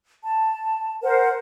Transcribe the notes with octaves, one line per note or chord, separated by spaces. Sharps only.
A5
A#4 C5 F#5